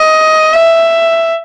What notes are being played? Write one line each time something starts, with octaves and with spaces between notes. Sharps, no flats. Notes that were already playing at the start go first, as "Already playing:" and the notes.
Already playing: D#5
E5